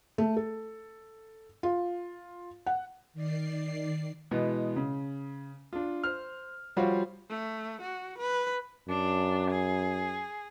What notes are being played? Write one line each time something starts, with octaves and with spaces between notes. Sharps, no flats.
A3
A4
F4
F#5
D#3 D5 C7
B2 E3 G#3 B3
C#3
D4 F4
C5 F6
F3 G3 F#4 C5 C#5 F5
A3
F#4
B4
F#2 D4
G#4